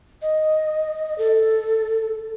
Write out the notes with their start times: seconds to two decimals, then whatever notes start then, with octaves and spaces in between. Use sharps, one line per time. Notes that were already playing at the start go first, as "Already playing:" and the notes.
0.22 D#5
1.18 A4